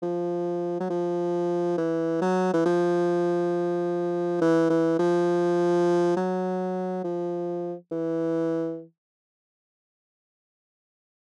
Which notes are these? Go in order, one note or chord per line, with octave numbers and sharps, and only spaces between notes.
F3
F#3
F3
E3
F#3
E3
F3
E3
E3
F3
F#3
F3
E3